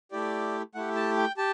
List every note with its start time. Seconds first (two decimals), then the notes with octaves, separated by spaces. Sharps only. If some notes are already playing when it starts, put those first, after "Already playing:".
0.12 A3 E4 G4 D5
0.75 A3 E4 G4 F#5
0.96 A5
1.17 G5
1.37 G4 A5